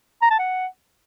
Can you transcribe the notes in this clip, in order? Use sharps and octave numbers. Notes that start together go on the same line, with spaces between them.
A#5
A5
F#5